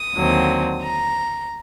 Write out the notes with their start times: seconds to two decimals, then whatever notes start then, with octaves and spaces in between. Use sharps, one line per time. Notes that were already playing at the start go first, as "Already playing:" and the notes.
Already playing: D#6
0.14 D#2 D3 F#3 C4
0.82 A#5